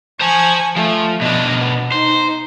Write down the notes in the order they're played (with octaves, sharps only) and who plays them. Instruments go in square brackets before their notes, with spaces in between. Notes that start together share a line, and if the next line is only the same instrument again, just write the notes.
[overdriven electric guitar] C5 A5 [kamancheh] G#5 C#6
[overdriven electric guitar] F3 [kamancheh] A3
[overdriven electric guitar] B2 D4 [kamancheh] D#5
[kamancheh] B3
[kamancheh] D#4 [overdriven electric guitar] C5